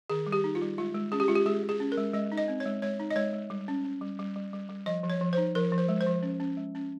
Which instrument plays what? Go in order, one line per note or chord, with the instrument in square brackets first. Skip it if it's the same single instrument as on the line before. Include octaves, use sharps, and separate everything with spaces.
[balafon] D#3 G#4
G3
G4
D#4
F4
G3
G#3 F4
G#3
C#4 G#4
G4
G#3 F4
G4
G#3 G#4
G#3
G#4
C#4
A#4
G#3
G#3 D#5
D#4
D#5
C4
C#5
G#3
G#3 C#5
D#4
D#5
G#3 C#5
G#3
G3
C#4
C#4
G3
G3
G3
G3
G3
F3 D#5
F3
C#5
F3
D#4 C5
F3 A#4
F3
C5
G#3
C5
F3
C#4
C#4
G#3
C#4